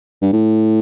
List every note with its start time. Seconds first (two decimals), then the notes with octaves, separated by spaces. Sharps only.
0.22 G2
0.33 A2